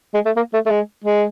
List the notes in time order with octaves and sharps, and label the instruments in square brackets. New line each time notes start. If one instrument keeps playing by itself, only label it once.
[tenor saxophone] G#3
A3
A#3
A3
A3
G#3
G#3